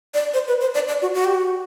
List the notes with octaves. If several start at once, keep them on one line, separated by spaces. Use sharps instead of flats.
D5
C5
B4
C5
D5
D5
F#4
F#4
G4
F#4